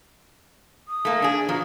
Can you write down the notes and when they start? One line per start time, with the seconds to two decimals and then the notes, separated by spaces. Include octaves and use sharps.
0.88 D#6
1.05 A3 A#3
1.22 D4 G#4
1.49 B2 F3 A#5